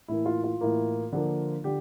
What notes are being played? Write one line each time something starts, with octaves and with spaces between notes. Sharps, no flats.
A2 E3 A#3 E4
F4
F4
A2 E3 A#3
D3 F3 A#3
D3 G4